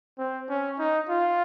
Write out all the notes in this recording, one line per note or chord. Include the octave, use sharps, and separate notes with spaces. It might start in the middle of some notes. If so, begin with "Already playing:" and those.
C4
C#4
D#4
F4